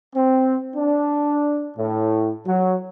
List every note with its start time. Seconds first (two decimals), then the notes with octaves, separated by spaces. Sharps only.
0.14 C4
0.76 D4
1.76 A2
2.46 F#3